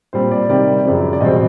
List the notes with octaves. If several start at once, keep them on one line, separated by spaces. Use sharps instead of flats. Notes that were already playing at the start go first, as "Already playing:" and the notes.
A#2 G3 C4 C5
D5
C3 D#3 G3 D5
F#2 C#3 F3
D5
E2 B2 G3 C4 D#5